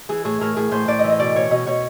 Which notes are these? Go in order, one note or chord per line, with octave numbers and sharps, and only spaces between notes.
E3 G#4
A2 G#4
A2 A#4
A2 G#4
A2 C5
A2 D5
E3 D#5
D#5
B2 D5
B2 C#5
B2 D#5
B2 C#5